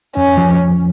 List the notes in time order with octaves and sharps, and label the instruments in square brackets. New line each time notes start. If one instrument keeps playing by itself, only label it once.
[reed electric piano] F2 [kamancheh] C#4
[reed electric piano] F3